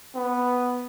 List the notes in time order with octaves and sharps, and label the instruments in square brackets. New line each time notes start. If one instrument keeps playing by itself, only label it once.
[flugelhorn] B3